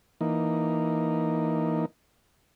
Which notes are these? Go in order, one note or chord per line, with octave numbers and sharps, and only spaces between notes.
E3 A#3 D#4